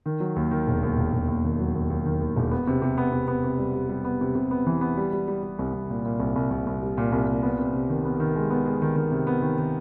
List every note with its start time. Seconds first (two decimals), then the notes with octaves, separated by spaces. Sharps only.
0.06 D#3
0.20 F#3
0.36 D#2
0.51 D#3
0.67 E1
0.83 D#2
0.97 E1
1.13 E1
1.28 D#2
1.44 D#3
1.60 F#3
1.75 D#2
1.90 D#2
2.06 D#3
2.21 D#2
2.36 E1
2.51 B3
2.67 C3
2.82 C3
2.98 B3
3.12 C3
3.28 B3
3.44 C3
3.59 G3
3.74 G3
3.89 G3
4.05 B3
4.21 C3
4.35 C3
4.51 B3
4.67 E3
4.81 B3
4.97 G3
5.13 G3
5.28 G3
5.43 G3
5.59 C2
5.73 C2
5.90 A#2
6.05 A#2
6.19 C2
6.36 C2
6.51 C2
6.66 C2
6.82 G3
6.98 A#2
7.12 C2
7.27 A#2
7.43 B3
7.59 C3
7.73 C3
7.89 D#3
8.05 B3
8.20 D#3
8.36 G#3
8.50 B3
8.65 G#3
8.82 D#3
8.96 D#3
9.11 C3
9.27 B3
9.42 D#3
9.58 D#3